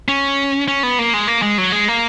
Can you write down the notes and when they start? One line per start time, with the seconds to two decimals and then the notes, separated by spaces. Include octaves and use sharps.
0.08 C#4
0.68 C#4
0.83 B3
0.99 A#3
1.14 G#3
1.28 A#3
1.42 G#3
1.58 F#3
1.72 G#3
1.88 A#3